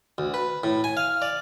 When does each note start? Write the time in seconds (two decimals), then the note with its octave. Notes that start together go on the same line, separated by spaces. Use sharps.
0.18 D2
0.34 B4
0.63 A2
0.84 G#5
0.97 F5
1.22 D5